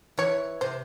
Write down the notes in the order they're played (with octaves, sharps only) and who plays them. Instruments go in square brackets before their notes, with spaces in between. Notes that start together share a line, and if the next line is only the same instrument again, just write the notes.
[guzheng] E3 [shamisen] C#5
[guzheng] C3 [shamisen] C5